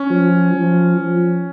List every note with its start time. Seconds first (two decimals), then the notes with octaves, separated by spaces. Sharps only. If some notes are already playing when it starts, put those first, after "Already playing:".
Already playing: C#4
0.10 F3
0.54 F3
0.97 F3